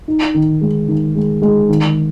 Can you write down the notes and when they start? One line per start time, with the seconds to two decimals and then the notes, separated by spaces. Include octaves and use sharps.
0.08 D#4
0.34 D#3
0.61 G#3
0.88 D#3
1.16 G#3
1.42 G#3
1.69 D#3